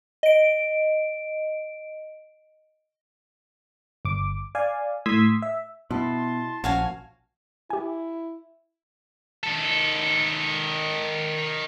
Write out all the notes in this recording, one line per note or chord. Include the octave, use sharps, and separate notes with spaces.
D#5 D7
G1 D6
D5 F5 G#5
A2 C6 D#6 E6 G#6 B6
E5
B2 E4 A5 C6
A#1 C#4 F#4 F5 G#5 A5
E4 G4 G#5
D#3 A4